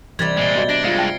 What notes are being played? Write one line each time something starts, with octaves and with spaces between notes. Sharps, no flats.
C3 E3 G3 G#6 A6
A#2 G#3 G#6 G7
B3 F#4 D#5
D4 G#6 A#6 D7
G2 G#3 F4 F5 F6 C7 C#7
G5 A5